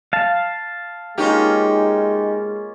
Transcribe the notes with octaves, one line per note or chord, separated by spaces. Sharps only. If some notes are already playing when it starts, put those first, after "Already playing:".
F5 A5
G#3 A#3 C#4 D#4 F4 G4